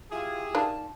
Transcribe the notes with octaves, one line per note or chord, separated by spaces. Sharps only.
E4 F4 G4 G#4
D#3 D4 F4 A5